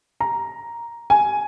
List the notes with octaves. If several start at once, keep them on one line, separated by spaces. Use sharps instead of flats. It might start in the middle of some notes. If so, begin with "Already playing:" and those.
A#5
G#5